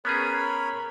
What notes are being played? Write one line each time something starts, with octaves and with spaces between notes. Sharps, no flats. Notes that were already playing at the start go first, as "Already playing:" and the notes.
B3 C#4 G#4 A#4 C#5 B5